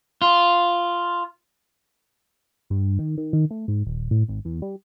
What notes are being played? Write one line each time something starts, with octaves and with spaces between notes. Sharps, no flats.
F4
G2
D#3
D#3
D#3
A3
G#2
D#1
A2
G#1
E2
G3